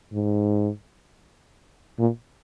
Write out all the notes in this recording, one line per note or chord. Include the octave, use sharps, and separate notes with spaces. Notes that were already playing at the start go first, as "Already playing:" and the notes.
G#2
A#2